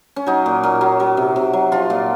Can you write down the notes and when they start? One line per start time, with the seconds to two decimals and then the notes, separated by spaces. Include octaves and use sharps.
0.16 C#4
0.26 F#3 D#4
0.46 A#2
0.63 A#2
0.81 F#3
1.00 F#3
1.17 C3
1.36 C3
1.53 F#3
1.72 F3 F4
1.90 A#2